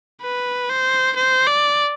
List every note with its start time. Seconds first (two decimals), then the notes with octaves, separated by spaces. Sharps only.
0.22 B4
0.69 C5
1.16 C5
1.47 D5